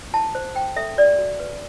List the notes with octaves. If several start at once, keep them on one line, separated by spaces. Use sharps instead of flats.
E4 A5
C5
C5 G5
A4 E5
F#4 D5
F#4
B4